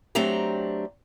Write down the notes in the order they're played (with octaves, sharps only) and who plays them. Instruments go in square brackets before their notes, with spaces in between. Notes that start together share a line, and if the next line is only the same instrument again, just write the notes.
[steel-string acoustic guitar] F#3 A3 C4 D4 G4 A#5